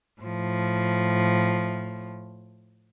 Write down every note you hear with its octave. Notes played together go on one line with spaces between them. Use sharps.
A2 F3